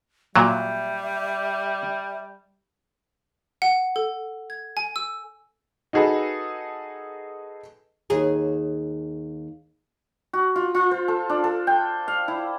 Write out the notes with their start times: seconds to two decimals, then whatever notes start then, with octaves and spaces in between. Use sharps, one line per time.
0.36 A#2 F#3 G3 E5
3.62 F#5
3.96 A4
4.50 G#6
4.77 G#5
4.96 E6
5.93 D#4 F#4 G#4 A4 B4
8.10 D#2 G#4
10.33 F#4
10.56 F4
10.75 F4
10.91 C5
11.08 A4
11.30 D4
11.44 A4
11.67 G5
12.08 F5
12.28 E4